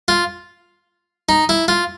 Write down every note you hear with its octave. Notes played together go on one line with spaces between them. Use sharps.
F4
D#4
E4
F4